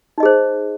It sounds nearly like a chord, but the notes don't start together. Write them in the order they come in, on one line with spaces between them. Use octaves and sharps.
D#4 D#5 G#4 C5